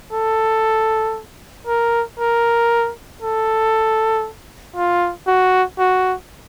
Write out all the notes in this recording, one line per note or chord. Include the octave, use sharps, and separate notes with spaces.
A4
A#4
A#4
A4
F4
F#4
F#4